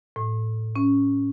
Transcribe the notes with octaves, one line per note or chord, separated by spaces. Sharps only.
A2
C#4